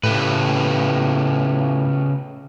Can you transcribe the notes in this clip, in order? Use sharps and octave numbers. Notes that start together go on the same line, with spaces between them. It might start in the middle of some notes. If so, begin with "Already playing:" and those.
A2 C#3 G4 B4